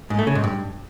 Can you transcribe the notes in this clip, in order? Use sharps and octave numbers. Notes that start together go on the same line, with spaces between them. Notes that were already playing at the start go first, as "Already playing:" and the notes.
G#2
A3
C#3
G#2
G2